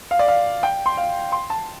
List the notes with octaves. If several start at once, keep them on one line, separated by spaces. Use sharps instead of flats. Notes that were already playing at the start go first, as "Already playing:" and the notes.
F5
D5
F5
G5
C6
F5
C6
A5